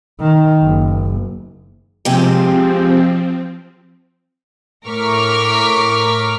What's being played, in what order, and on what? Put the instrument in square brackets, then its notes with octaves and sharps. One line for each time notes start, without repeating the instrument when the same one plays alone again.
[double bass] D#3
F#1
[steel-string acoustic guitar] C3 G#3 G4 [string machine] F3 C4
[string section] A2 A#4 C#6 D6 F6 B6